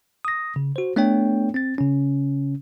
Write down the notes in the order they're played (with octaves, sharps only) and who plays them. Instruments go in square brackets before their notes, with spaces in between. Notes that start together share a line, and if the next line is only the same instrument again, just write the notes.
[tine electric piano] D#6 A#6
C#3
F#4 C5
A3 B3 D4 A4 C#5 G5
C4 A6
C#3 C#4